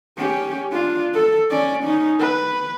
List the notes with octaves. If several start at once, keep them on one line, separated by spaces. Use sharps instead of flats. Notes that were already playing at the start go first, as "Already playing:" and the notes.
C#4 G4
D4 F4
A4
C#4 D5
C#4 D#4
B4